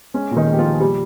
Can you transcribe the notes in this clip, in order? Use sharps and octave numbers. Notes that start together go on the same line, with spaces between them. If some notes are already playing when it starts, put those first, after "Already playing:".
G#3 C#4
A#2
D#3 D#4
G#3
G4
F3 F4
A#2
G#4
F3 G3 G4